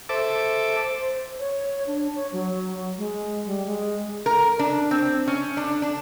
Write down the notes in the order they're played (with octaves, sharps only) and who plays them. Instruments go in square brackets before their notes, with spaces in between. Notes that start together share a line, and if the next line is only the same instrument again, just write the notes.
[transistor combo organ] A4 E5 D6 [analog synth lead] C5
[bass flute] C#5
D4
C#5
F#3
G#3
G3
G#3
[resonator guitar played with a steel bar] A#4
D4
C4
C#4
D4
D4